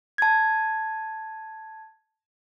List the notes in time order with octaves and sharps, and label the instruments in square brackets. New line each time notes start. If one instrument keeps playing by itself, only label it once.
[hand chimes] A5 G#6